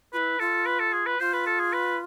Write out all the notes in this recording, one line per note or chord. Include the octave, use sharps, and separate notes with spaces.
E4 F4 B4
F4 A4
B4
A4
G#4
B4
F4 C5
B4
A4
G#4
B4